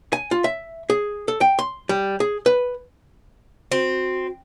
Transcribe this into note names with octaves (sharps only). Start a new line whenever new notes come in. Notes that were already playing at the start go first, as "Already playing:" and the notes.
G#5
F4
E5
G#4
A4
G5
C6
G3
G#4
B4
C4 F#4